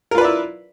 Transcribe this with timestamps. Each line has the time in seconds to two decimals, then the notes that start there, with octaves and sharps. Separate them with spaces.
0.11 A#4
0.15 F4
0.18 B4
0.21 D5
0.24 E4